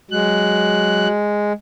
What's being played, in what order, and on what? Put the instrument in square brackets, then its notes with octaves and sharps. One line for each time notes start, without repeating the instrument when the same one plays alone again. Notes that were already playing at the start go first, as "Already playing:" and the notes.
[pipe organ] F#3 F#6 [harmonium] G#3